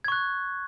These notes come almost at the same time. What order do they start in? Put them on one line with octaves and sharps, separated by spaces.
G#6 C#6 F#6